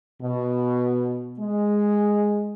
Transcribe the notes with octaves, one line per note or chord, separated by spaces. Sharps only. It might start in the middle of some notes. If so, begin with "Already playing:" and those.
B2
G#3